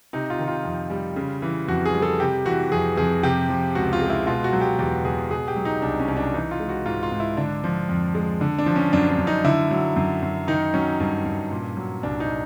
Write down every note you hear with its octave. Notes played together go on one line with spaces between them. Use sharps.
C3 D#4
F4
D#3
F4
F2
G3
C#3
E3
F2 F#4
G#4
G3
A4
C3 G4
E3 F#4
F2 G#4
F2 G#4
C3 G4
F3
C#2 F#4
F4
G#3
E4
B2 F4
F#4
F#3
G4
E2 G4
E2 G#4
B2 G#4
G4
F#3
D#4
C2 D4
C#4
C2
D4
E3 D#4
F4
G#3
F#4
G#2 F4
F4
G#2
E4
D3 D4
F3
F2
G#3
D3
D4
F3
C#4
F#2 D4
D4
F#2
D#4
D3 E4
F#3
F#2
F#2
D#3 D#4
F#3 C#4
G2
G2
A#2
F#3
C2 D4
D#4